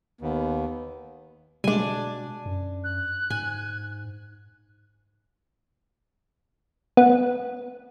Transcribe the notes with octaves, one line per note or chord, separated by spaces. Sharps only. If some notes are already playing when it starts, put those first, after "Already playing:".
D#2 B3
B2 G3 G#3 D4 G#5
F#2
F#6
G#2 G#5
B3